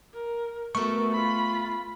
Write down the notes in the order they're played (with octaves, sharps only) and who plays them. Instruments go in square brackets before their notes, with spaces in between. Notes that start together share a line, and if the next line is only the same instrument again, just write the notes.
[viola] A#4
[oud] A3 B3 [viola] F#4 A#4 [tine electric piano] C#6
[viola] F4 B5